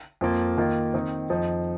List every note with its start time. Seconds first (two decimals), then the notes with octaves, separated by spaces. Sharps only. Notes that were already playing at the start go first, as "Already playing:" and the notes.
0.21 F2 F3 A#3 F4
0.58 D#3 A#3 F4
0.94 D#3 C4 D#4
1.30 F2 F3 D#4